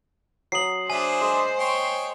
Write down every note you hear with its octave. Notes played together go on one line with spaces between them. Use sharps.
F#3 D#6 C7 F#7
D4 G#4 C5 E5 G#5
G#3 D#5
C#5 G5 C6